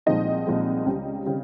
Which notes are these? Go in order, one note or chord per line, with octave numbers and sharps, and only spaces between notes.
C2 A#2 F3 G#3 C4 D#4 D#5
C2 A#2 F3 G#3 C4
C#2 C#3 G3 C4
C#3 G3 C4